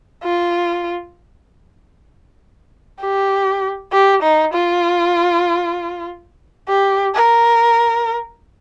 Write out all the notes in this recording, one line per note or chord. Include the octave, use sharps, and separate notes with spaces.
F4
G4
G4
D#4
F4
G4
A#4